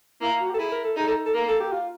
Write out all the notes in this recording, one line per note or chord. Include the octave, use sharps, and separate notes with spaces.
A#3 E4
F4
F#4
G4
A4
E4 G#4
A#4
A4
D#4 G#4
A4
A4
A#3 A#4
A4
G4
F4